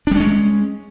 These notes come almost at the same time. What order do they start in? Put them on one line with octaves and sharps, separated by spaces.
D4 G3 C#4 G#3